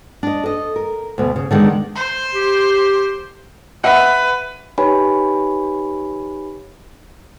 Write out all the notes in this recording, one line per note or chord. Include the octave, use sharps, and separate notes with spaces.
D4 D#5
A4 D#5
A#4
D2 B2
C#3
D3 D#3 G#3 B3
C5
G4
B4 E5 F#5
D#4 G4 B4 C#5 G#5 B5